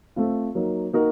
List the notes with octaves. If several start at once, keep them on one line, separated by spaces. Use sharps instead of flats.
A3 C4 F4
F#3 A#3 D#4
A#3 D#4 F#4 A#4